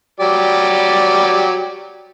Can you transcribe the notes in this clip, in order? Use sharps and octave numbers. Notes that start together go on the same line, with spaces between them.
F#3 G4 D5